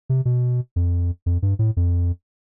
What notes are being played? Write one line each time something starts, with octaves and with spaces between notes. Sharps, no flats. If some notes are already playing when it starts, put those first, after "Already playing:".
C3
B2
F2
F2
G2
A2
F2